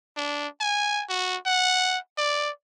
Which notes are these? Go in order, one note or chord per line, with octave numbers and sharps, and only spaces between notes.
D4
G#5
F#4
F#5
D5